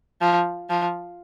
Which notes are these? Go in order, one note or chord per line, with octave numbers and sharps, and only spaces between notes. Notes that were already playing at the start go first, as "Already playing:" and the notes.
F3
F3